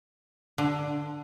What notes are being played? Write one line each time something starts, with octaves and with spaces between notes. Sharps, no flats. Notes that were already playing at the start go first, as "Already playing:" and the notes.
D3